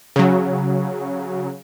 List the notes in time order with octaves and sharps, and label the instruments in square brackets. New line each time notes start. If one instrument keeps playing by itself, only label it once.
[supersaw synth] C#3 F#3